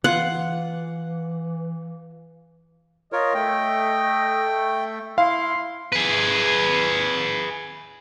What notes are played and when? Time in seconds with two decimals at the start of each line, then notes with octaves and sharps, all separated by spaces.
0.04 E3 F4 F#5
3.12 F4 A#4 C#5 D#5
3.34 A3 G5
5.18 E4 F5 C6
5.92 G#4 B4